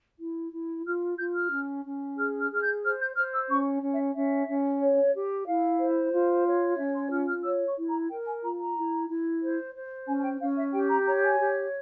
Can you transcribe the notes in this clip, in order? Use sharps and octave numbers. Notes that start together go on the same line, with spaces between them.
E4
E4
F4 F6
F4 G6
F6
C#4
C#4
G#4 F6
F6
G#4 F6
G6
C5 F6
G6
C5 F6
E6
C#4 C#6
C#4
E5
C#4 E5
C#4
C#5
G4
E4 F5
C5
F4
C#5
C#4 E5
C6
F4 F6
F6
C#5 E6
C#6
E4
A#5
A#4 G5
G#5
F4 A#5
A#5
E4
E4
C5
C5
C#4 G#5
G#5
G5
C#4 F5
E5
G4 G5
A#5
C#5 A#5
G#5
G4